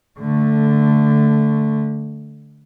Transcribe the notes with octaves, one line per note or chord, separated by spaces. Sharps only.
D3 A3